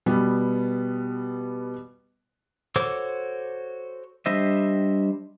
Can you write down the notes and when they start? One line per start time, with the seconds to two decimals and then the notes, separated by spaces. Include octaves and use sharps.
0.06 B2 G3 B3
2.76 F#4 A4 C5 C#5 D6
4.26 G3 D4 C5 D#5 E5